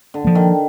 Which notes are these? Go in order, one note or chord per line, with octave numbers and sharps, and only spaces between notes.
D3
F3 A#3
D#3